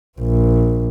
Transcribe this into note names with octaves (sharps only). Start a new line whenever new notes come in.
A#1